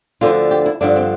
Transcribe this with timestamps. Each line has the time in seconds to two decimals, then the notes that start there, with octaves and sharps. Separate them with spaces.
0.21 D2 D3 F3 F4
0.51 G4
0.66 E4
0.81 G2 D3 F3 D4
0.96 C4